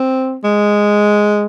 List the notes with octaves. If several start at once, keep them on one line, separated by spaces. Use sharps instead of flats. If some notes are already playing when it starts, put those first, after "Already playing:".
Already playing: C4
G#3